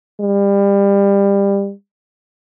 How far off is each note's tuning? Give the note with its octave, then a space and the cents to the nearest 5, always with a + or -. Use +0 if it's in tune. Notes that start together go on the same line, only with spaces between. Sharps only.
G3 +25